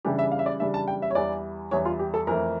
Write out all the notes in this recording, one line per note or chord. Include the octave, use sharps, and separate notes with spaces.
C#3 E3 G3 D4 G4
E5
F5
E5
D5
C#3 E3 G3 D4 E5
A5
G5
E5
C#5
E2 E3 G3 D5
E2 E3 G3 C#5
F4
G4
A4
F2 E3 A3 A#4